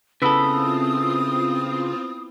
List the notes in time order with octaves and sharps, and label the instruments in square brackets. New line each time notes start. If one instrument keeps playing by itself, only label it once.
[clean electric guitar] C#3 A4 [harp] B3 E4 B4 [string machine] C4 F4 [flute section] D#6